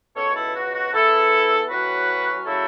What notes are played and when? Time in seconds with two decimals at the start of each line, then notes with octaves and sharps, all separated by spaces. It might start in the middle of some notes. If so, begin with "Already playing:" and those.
0.16 C#2 B2 B3 A4 C#5
0.35 E4 A4
0.55 F#4
0.74 F#4
0.93 E2 E3 B3 E4 A4
1.69 A2 F#3 C#4 F#4 B4
2.46 C#3 F#3 A3 E4 A4